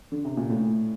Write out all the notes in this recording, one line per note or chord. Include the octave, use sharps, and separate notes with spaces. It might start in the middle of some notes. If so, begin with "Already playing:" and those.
D3
C3
A#2
A2